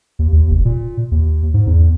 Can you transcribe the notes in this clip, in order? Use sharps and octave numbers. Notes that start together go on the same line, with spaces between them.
D#2
D#2
F1
A#2
D#2
G#2
E2